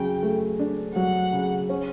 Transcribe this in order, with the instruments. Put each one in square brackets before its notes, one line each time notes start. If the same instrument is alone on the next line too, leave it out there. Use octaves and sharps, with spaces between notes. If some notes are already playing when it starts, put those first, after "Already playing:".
Already playing: [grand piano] C#3 F#3 [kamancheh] G5
[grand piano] A3
D4
[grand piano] F#3 [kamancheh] F#5
[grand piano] C#3
C#4